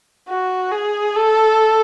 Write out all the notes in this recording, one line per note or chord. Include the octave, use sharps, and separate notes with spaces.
F#4
G#4
A4